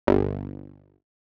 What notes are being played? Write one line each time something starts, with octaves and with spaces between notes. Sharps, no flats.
G1